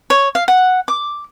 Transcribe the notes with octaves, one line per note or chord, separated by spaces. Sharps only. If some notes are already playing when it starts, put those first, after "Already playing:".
C#5
F5
F#5
D6